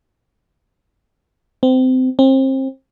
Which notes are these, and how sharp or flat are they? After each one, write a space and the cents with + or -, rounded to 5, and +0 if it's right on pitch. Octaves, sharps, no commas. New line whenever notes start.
C4 -25
C4 +30